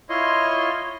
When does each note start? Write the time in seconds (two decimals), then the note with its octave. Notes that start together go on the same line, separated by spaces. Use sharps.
0.09 E4 F4 C#5 D#5 C6